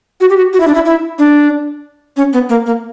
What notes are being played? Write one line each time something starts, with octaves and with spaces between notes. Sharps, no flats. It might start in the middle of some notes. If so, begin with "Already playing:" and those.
F#4
G4
F#4
F#4
E4
D4
E4
E4
D4
C#4
B3
A#3
A#3